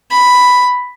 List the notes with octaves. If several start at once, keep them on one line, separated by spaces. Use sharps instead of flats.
B5